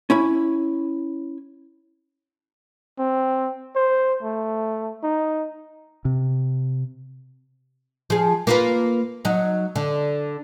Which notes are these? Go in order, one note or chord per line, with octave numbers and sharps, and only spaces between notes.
C#4 E4 B5
C4
C5
A3
D#4
C3
F3 G#4
A#3 F4 B4
F#3 D#4
D3